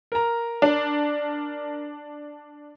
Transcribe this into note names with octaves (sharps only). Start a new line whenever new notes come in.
A#4 A#5
D4